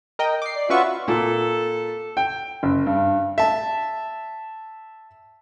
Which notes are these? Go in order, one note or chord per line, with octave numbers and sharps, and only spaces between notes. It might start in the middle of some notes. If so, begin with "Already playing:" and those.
A#4 D#5 G5
D6 C7
D5
C#4 F4 F#4 B4 E5 C#6
A#2 A4
G5
F#1
G2
E5 A5